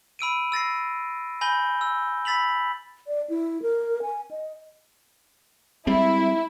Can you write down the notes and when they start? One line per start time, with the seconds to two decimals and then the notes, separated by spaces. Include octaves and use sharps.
0.19 B5 E6 D7 D#7
0.52 E6 A6 A#6 C7
1.41 G#5 B5 G6 A#6 G7
1.81 E6
2.25 B5 E6 A6 B6 F7 F#7
3.07 D5
3.30 E4
3.62 A#4
4.02 G#5
4.31 D#5
5.87 G3 G#3 C4 E4